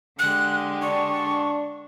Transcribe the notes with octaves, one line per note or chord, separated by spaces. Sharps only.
D3 G#3 G4 F#6
D4 C#6